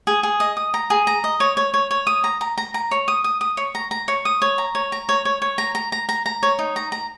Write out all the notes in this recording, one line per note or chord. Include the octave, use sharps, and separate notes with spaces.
G#4
G#4
D#5
D#6
A#5
G#4
A#5
D#5
C#5
C#5
C#5
C#5
D#6
A#5
A#5
A#5
A#5
C#5
D#6
D#6
D#6
C#5
A#5
A#5
C#5
D#6
C#5
A#5
C#5
A#5
C#5
C#5
C#5
A#5
A#5
A#5
A#5
A#5
C#5
D#4
A#5
A#5